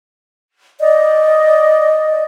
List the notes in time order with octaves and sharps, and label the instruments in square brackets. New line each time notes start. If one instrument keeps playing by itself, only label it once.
[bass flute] D5 [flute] D#5